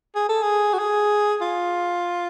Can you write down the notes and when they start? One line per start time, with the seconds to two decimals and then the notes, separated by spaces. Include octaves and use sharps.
0.15 G#4
0.29 A4
0.42 G#4
0.73 F#4
0.78 G#4
1.41 F4